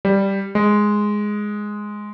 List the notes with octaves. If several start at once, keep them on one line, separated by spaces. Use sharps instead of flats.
G3
G#3